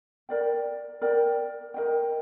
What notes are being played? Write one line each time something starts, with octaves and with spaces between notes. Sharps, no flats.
A#4 D5 G5
A#4 D5 G5
A#4 D#5 G5